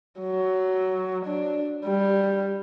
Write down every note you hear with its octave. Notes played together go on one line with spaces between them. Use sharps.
F#3
D4
G3